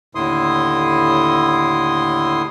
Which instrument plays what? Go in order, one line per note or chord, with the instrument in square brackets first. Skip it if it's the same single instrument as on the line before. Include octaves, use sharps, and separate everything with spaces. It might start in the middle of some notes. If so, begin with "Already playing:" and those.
[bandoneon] D#2 A2 D3 E4 C6 D#6